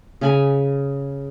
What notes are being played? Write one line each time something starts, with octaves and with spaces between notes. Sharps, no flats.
C#3 G#5 B5